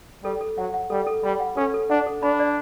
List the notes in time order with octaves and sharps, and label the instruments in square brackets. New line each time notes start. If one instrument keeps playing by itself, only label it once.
[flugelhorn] G3 [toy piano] A4
[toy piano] A4
[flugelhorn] F#3 [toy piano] F#5
[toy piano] F#5
[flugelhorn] G3 [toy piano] A4
[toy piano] A4
[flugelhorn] G3 [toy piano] B5
[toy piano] F#5
[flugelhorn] C#4 [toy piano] A4
[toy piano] A4
[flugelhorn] D4 [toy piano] F#5
[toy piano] A4
[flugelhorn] D4 [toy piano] B5
[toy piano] D5